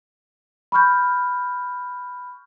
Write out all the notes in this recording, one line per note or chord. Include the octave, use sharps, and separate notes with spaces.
B5 C#6 F6 G6